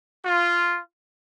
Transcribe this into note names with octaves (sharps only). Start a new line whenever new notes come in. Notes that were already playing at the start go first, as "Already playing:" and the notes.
F4